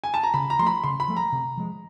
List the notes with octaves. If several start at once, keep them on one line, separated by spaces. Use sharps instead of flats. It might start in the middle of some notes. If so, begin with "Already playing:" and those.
G#5
A5
A#5
C#3 B5
A#5
F3 A3 B5 C6
C#3 C6
B5
F3 A3
A#5
C3
F3 G#3